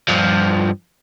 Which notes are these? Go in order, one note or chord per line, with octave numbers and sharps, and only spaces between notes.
G2 F3